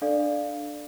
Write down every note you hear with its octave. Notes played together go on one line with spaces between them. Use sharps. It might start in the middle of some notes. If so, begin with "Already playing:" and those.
D4 A4 D5 F5